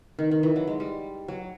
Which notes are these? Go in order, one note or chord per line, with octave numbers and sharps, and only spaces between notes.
D#3
D#3
E3
F#3
G#3
G3
F#3